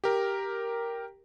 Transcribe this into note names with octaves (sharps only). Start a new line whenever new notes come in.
G4 A#4